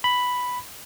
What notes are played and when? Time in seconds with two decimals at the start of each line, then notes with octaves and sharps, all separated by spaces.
0.04 B5